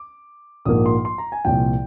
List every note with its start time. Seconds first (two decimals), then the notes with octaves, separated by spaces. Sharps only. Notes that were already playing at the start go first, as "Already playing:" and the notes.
Already playing: D6
0.65 A#1 G#2 F3 A#3 D#6
0.86 C6
1.05 C6
1.18 A#5
1.32 G#5
1.45 C2 A#2 F3 G5